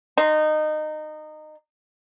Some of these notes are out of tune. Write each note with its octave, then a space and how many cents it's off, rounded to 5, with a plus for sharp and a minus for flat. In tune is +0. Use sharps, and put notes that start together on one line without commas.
D#4 -20 C6 +0